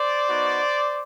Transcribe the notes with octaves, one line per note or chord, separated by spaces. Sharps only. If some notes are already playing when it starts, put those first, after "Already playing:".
Already playing: C5 D5
B3 D#4 F#4